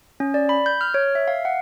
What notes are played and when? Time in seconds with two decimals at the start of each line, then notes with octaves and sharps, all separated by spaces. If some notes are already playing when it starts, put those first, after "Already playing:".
0.20 C#4
0.34 D5
0.49 B5
0.66 G6
0.81 F6
0.94 C#5
1.15 E5
1.28 F5
1.45 F#5